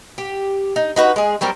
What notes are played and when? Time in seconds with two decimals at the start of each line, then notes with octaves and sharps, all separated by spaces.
0.18 G4
0.76 D#4
0.96 D#4 F#4 B4
1.16 G#3 G#4
1.41 F#3 G3 C4 A#4